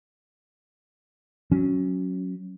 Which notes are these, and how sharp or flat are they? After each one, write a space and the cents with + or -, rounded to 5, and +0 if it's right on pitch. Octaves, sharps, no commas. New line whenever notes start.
F#3 +0 C#4 +0